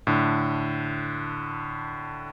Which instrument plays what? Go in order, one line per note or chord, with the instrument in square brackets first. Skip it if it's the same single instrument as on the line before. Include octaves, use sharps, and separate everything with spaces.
[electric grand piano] A2 D3